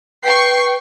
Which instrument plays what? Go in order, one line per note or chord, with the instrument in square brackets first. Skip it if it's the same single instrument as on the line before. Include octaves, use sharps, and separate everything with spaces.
[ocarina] B4 [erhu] G5 [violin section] C#6 C7